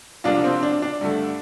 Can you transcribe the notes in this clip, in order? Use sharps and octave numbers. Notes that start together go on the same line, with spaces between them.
C2 C3 F3 A#3 D4 F4
C4
D4
D4
G2 D3 A3